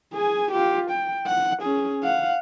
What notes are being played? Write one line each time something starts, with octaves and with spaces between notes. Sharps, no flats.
G#4 G#5
F4 G4
G5
F#5
C#4 G#4
F5 F#5